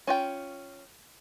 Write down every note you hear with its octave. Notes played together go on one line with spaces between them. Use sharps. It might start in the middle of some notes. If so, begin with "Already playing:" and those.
C#4 F4 G5